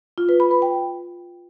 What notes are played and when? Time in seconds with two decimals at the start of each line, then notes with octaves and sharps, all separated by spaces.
0.18 F4
0.29 B4
0.40 B5
0.51 B4
0.62 G5